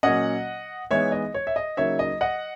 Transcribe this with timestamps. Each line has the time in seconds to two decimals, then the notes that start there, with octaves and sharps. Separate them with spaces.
0.03 A#2 F#3 A#3 C#4 D#5 F#5
0.91 E3 G#3 B3 D#4 C#5 E5
1.12 D#5
1.34 C#5
1.47 E5
1.56 D#5
1.77 C#3 F#3 A#3 D#4 C#5 E5
1.99 D#5
2.21 D#5 F#5